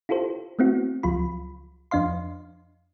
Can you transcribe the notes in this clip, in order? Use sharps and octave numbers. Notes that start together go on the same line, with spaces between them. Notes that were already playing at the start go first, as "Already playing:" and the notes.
E4 F4 G4 A4 C5
A3 B3 C4 E4 F#4
C#2 F3 F#3 F4 B5
F2 F3 D4 D#5 F5 C6